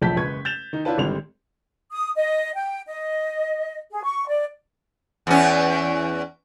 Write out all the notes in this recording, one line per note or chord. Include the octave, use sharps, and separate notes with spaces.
E1 A#1 F2 A5 G6 B6
F#1 G#3 B4 C#6 G#6
G6 A6 E7 F7 G7
D#3 D#4
C#4 D4 E4 F4 B4 A5
G#1 D3 G3 G#3 C4 F7
D#6
D#5
G5
D#5
G#4
C#6
D5
E2 C#4